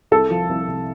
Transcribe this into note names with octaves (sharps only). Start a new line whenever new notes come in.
C2 A4
F3
C2
C3